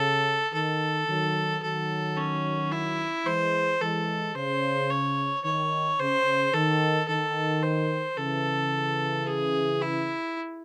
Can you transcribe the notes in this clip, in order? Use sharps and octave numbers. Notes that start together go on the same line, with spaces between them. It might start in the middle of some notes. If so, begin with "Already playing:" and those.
Already playing: C#3 A4
D#3 A4
D#3 F#3
D#3 F#3 A4
C#4
E4
E3 G#3 C5
E3 G#3 A4
C#3 C5
C#5
D#3 C#5
C#3 C5
D#3 A4
D#3 A4
C5
C#3 E3 A4
G#4
E4